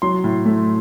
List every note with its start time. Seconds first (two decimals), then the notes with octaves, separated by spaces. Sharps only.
0.02 F#3 C6
0.24 A2
0.45 A3